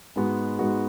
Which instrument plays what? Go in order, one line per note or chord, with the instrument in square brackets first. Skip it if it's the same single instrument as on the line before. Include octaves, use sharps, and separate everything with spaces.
[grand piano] G#2 G#3 B3 F#4
G#2 G#3 B3 F#4